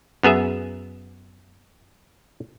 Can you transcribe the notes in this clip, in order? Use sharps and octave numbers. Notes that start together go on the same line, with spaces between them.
F#2 B3 G#4 E5